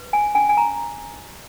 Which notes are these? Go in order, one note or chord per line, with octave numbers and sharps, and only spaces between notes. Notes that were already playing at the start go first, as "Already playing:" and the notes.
Already playing: B4
G#5
C#4 G#5
G#5
A#5